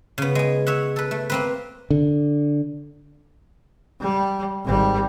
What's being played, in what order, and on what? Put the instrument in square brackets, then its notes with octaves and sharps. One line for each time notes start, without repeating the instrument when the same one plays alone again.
[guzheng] C#3 B3
G#3 G#4
C#5 E5 F#5
A4 B4
A3
A#3 C4 B4
[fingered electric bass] D3
[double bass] G3
G#1 G3